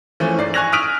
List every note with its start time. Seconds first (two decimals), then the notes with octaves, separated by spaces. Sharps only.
0.20 E3 F3 A3 C#4
0.37 G#2 D5 C7
0.54 G#5 C#6 F#6 G#6 A#6 F7
0.72 D#6 F6 B6 D7 D#7 F7